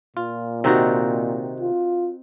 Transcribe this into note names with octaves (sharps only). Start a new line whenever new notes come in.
A#2 F4
C3 D#3 C4 D#4 F#4
F4